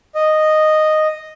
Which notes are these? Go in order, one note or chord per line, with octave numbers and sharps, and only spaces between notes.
D#5